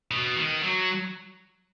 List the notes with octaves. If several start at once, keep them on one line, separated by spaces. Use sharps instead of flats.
B2
D#3
F#3